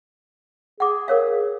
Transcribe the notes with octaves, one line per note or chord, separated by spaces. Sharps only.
G#4 F#5 D6
A#4 C#5 F5